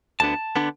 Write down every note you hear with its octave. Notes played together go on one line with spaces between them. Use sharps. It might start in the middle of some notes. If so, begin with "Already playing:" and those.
D2 D3 B3 D4 A5
D3 B3 D4